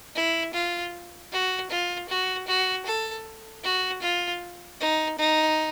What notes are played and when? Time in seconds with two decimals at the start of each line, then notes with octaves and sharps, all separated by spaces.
0.15 E4
0.54 F4
1.32 F#4
1.70 F4
2.09 F#4
2.48 F#4
2.86 A4
3.64 F#4
4.02 F4
4.80 D#4
5.19 D#4